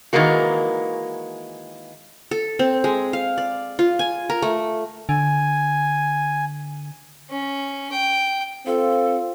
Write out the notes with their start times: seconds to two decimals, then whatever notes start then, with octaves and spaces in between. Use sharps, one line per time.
0.13 D#3 E3 G#3 A#3 F#4
2.31 A4
2.59 C4
2.84 G#3
3.13 F5
3.38 D5
3.79 F4
3.99 G#5
4.30 A#4
4.42 A3
5.09 D3 G#5
7.30 C#4
7.92 G5
8.66 C4 F4 A4